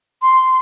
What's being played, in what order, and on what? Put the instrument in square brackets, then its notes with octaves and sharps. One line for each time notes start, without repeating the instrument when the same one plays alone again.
[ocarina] C6